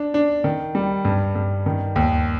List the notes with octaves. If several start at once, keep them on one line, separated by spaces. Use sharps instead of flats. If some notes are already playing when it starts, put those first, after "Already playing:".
Already playing: D4
D4
D#3
G3
G2
G2
D#3
D#2